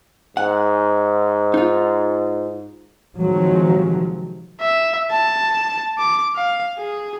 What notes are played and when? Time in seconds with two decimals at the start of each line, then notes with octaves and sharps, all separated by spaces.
0.37 G#2 F#5
1.54 D#4 F4
3.21 C3 D#3 F3 F#3 G#3
4.61 E5
5.11 A5
5.99 D6
6.36 F5
6.78 G#4